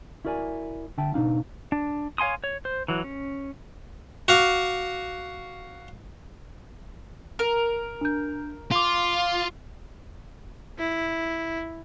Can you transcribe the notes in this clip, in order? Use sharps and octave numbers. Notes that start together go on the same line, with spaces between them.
E4 F#4 A#4 D5 G5 G#5
D3 E5 G5 A5
B2 D4 D#4 F5
D4
C#5 F5 G#5 C6 D#6
C#5
C5
E3 F#3
C#4
F#4 F5 D6
A#4
D4 G6
F4 C6 D6
E4